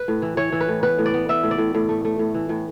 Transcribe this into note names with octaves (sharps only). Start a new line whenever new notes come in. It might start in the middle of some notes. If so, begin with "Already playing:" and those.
Already playing: B4
A2
E3
E3 C#5
E3
B4
A2
B3 B4
A2
D5
B3
B3 E5
A2
D5
A2
A2
A3
A3
A2
E3
A2